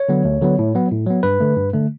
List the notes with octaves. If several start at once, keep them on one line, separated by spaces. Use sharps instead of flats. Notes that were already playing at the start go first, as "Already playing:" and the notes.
Already playing: C#5
D3 F#3 B3
D2
D3 F#3 B3
A2
F#3 B3
A2
F#3 B3
G2 B4
D3 A3
G2
D3 A3